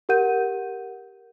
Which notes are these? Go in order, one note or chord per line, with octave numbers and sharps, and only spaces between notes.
G4 A#4 F#5 G6 D#7